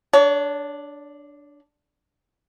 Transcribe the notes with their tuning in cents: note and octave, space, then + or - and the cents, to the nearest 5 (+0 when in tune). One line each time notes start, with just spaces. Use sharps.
D4 +0 C#5 +35